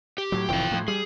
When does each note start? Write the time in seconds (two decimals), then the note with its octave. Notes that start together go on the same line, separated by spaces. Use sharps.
0.18 G4
0.32 A2 F#3
0.49 F1 A2 E3 F4 G5
0.71 A2 F3
0.88 G3 G#4